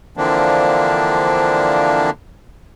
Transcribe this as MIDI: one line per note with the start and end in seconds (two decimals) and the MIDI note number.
0.17 2.10 50
0.17 2.10 52
0.17 2.10 53
0.17 2.10 58
0.17 2.10 60
0.17 2.10 62